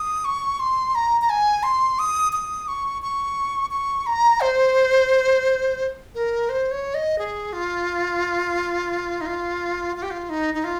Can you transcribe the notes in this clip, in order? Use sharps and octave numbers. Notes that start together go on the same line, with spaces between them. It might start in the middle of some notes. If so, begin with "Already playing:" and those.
Already playing: D#6
C#6
C6
A#5
A#5
G#5
C6
D#6
D#6
C#6
C#6
C#6
A#5
C5
A#4
C5
C#5
D#5
G#4
F4
D#4
F4
F4
G4
F4
D#4
D#4
F4